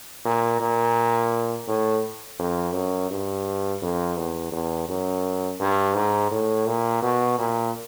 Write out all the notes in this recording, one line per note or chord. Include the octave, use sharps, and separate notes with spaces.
A#2
A#2
A2
F2
F#2
G2
F2
E2
E2
F#2
G2
G#2
A2
A#2
B2
A#2